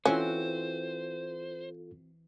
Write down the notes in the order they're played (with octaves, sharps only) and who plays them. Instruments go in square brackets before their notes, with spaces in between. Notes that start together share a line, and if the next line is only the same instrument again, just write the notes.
[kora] E3 C4 F#4 [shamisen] C#4 [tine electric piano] F4 A4 [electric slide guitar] C5